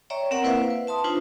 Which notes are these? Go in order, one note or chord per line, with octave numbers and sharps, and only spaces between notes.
C#5 D5 E5 G5 A#5 C#6
C4 A#4 D5 F#5
A#3 E4 B4 C5 E5 F5
B4
E5 A5 C6 D#6
D4 D#4 F4 B4 C5